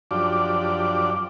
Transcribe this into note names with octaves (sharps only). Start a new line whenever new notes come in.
F#2 F3 D4 G4 D5